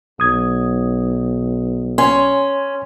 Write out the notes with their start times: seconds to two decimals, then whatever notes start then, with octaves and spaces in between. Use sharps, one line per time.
0.20 B1 D#6 G#6
1.98 C#4 C#5 G#5 C6